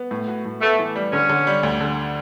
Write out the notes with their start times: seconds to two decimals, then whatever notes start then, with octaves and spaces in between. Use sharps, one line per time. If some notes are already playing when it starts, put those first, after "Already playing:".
Already playing: B3
0.11 A2
0.28 F#4
0.45 A2
0.62 A3 B3
0.79 E3
0.96 G3
1.13 D3 C#4
1.29 D3
1.47 G3
1.63 D2
1.81 D3